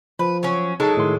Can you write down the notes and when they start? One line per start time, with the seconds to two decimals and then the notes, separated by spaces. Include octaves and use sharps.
0.19 F3 B4
0.43 F#3 C#4
0.80 F#3 G#3 D#4 A4 A5
0.97 A2 D#3 C6